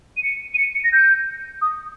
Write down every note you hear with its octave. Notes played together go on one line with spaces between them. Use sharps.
D#7
C#7
D#7
C#7
C#7
A#6
G6
D#6